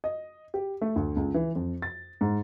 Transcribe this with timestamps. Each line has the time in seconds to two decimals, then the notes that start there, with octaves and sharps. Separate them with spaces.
0.04 D#5
0.54 G4
0.81 A3
0.96 D2
1.16 C#2
1.34 E3
1.56 F2
1.82 A6
2.21 G#2